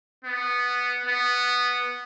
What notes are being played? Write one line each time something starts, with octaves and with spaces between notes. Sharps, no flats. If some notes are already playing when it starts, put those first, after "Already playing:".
B3
B3